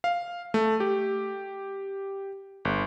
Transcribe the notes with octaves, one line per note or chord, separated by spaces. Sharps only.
F5
A3
G4
G1